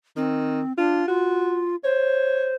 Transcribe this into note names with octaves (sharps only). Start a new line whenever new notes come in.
D#3 C4
D4 F4
F4 F#4
C5 C#5